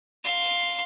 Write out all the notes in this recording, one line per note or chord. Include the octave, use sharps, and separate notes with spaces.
F5 C6